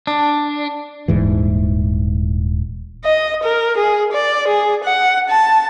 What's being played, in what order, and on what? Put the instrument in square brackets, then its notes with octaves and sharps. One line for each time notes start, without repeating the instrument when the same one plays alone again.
[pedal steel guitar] D4
[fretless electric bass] D#1 G#2 E3
[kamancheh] D#5
A#4
G#4
D5
G#4
F#5
A5